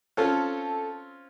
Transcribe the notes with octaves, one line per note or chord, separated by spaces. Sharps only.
C4 C#4 F4 A4